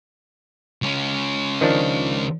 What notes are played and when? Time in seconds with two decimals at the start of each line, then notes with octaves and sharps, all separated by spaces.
0.82 C#2 C#4
1.61 D#3 F3 D4